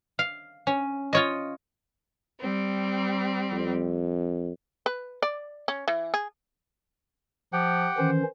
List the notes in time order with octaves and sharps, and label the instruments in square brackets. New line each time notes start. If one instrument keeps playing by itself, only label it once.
[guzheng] F5
C#4
F4 C#5 D#5
[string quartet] G3 C4
[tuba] F2
[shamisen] B4
D5
C#4
E3
G#4
[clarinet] F3 [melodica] G4 F#5 G5
[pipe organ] D#3 E3 C#4 [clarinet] C5